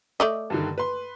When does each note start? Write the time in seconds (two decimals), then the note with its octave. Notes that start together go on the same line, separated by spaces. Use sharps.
0.20 A3 D5 D#5
0.50 G2 D3 D#3
0.78 B4 C6